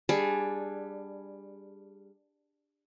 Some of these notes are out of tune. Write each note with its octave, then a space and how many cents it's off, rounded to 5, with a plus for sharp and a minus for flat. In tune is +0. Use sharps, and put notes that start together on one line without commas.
G3 +15 D4 +0 G#4 +5